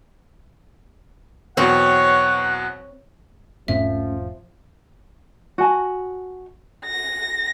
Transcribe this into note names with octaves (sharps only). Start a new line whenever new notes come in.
E2 B2 F#3 C4 F#4 C#5 F#5
E1 G#2 F3 A3 C4 C#4 E5
F#4 D#5 G#5 A5
A#6